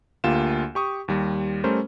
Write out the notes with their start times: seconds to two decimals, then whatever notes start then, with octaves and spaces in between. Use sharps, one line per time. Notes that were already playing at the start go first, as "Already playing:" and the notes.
0.24 D2 A#3 F4 G4 E7
0.75 G4 C#6 D#6
1.08 D#2 G3
1.64 G3 A3 C#4 A#4 C5